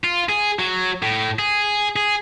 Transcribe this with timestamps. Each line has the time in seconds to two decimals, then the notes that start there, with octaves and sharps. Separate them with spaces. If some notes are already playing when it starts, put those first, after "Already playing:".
0.04 F4
0.29 G#4
0.59 F#3
1.03 A2
1.39 G#4
1.96 G#4